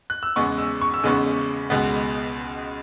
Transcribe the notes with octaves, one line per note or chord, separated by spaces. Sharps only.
F#6
E6
E2 C#3 G#3 B3 C#6
E6
C#6
E6
E2 C#3 G#3 B3 C#6
C#2 B2 G#3 B3